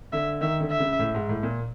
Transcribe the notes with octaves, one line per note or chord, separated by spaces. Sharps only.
D3 E5
D#3 E5
D3
E5
C#3
A2
G#2
A2
A#2